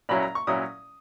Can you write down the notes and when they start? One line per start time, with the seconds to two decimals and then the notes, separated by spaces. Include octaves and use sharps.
0.09 A#2 F#3 C#4 E4 B5
0.22 A#5
0.35 C#6
0.47 A#2 F#3 C#4 E4 D#6